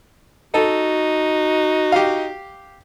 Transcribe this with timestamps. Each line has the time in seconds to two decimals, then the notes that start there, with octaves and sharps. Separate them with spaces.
0.54 D#4 F#4 A4
1.92 G4 F5